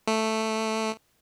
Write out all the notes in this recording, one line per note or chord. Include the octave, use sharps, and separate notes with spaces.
A3